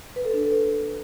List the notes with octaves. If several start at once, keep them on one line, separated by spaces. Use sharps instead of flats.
B4
A4
D4
A4
B4